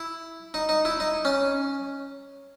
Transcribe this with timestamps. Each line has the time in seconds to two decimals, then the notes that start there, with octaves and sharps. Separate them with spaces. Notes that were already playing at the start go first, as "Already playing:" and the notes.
Already playing: E4
0.54 D#4
0.69 D#4
0.85 E4
1.00 D#4
1.25 C#4